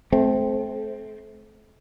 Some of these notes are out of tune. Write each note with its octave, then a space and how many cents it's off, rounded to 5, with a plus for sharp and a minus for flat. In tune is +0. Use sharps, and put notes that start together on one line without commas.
A3 -35 C4 +0